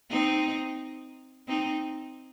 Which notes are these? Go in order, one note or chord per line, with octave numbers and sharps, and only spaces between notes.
C4 D#4
C4 D#4